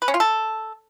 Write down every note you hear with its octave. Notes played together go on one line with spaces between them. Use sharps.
B4
C#4
F4
A4